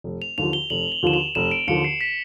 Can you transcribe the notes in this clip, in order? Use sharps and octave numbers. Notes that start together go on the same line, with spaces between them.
F1
F7
D#2 D3 F3 F7
G7
F1 F#7
F#7
D#2 D3 F3 E7
F7
F1 E7
D7
D#2 D3 F3 C#7
C7
B6